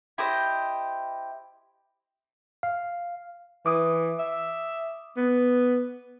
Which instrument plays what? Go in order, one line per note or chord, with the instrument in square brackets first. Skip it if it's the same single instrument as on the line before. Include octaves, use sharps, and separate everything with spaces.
[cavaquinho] E4 G4 C5 D#5
[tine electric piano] F5
[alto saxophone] E3 [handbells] D6 D#6
[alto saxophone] E5
B3